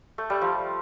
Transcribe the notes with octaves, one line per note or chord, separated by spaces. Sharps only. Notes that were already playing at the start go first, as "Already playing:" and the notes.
A3
G3
F3